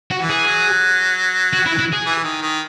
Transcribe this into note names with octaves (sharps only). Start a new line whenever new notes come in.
F#4
E3
G#4
F#3
F#4
E4
E4
G#4
E3
D#3
D#3